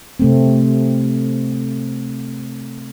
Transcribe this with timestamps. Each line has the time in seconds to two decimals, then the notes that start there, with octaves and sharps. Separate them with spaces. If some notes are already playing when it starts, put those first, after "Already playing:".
0.20 C3 A3 C4